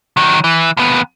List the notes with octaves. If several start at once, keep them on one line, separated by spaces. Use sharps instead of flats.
D#3 F#3
E3
D#2 B3